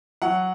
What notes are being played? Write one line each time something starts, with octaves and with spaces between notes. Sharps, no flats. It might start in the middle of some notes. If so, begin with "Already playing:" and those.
F#3 F#5